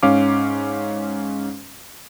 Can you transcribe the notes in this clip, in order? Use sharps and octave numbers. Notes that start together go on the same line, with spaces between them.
G#2 C#4 F5 D6